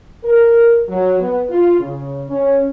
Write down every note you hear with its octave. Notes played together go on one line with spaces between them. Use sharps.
A#4
F#3
B3
F4
C#3
C#4